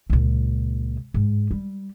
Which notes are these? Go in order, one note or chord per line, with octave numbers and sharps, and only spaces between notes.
C#2 A#2
G#2
G3